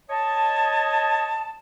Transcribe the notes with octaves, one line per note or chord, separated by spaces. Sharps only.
C#5 D#5 A5